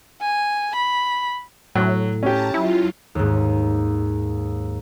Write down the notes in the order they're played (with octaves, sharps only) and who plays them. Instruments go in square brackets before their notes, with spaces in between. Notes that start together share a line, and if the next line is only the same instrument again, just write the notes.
[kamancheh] G#5
B5
[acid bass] A2 [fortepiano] F#3
[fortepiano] C#4 G4 [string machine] A5 A#5
[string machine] F#3 F4 [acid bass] E4
[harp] D#2 G#2